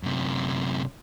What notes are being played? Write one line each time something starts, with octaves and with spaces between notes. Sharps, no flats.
F#2 C3